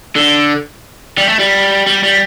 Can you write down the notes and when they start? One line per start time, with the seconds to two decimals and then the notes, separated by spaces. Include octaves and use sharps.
0.16 D3
1.18 G3
1.29 A3
1.39 G3
1.86 G3
2.03 G3